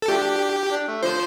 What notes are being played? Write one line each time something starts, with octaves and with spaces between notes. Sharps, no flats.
A4
F3 A3 D4 G4
D4
A3
D3 F3 C5